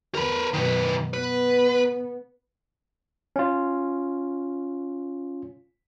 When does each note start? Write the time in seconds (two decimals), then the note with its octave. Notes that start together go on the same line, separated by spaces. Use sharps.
0.15 E2 A#4 B4
0.54 F#2 B2 D#3 B4
1.14 B3 B4
3.36 C#4 F4